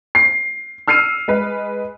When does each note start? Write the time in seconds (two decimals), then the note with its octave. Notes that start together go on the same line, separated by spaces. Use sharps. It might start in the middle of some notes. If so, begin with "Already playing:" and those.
0.15 C7
0.88 E6 F6 C7 C#7 D#7
1.28 G#3 B4